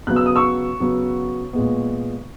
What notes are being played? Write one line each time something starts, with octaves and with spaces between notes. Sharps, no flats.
C#3 F#3 B3 F#6
E6
D#6
C#6 E6
C#3 F#3 B3
A#2 G#3 B3